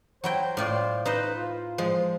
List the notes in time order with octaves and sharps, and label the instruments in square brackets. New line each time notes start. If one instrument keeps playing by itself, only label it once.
[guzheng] F#3 E4 G5 [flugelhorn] C5
[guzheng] A2 F4 D5
[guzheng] D#4 C5 D#5 [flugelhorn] B4
[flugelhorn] F4
[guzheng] F3 G#3